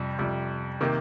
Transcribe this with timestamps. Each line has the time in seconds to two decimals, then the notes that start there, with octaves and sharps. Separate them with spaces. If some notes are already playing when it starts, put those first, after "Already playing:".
Already playing: F2 C3 G3
0.19 F2 C3 G3
0.81 C3 D#3 A#3